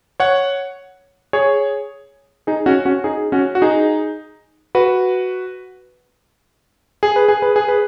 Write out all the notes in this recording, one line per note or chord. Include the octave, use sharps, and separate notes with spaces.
C#5 F#5
G#4 C#5
D#4 G#4
C#4 F#4
C#4 F#4
D#4 G#4
C#4 F#4
F#4
D#4 G#4
F#4 B4
G#4
B4
G#4
B4
G#4
B4